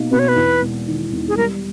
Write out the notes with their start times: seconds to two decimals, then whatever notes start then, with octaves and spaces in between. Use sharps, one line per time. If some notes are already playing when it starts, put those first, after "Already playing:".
Already playing: B2 A#3 D#4
0.11 B2 B4
0.19 C#5
0.28 B4
0.36 E2
0.61 E1
0.87 D#3
1.12 E1
1.28 G#4
1.37 G3 A#4